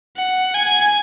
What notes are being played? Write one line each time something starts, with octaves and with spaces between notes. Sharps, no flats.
F#5
G#5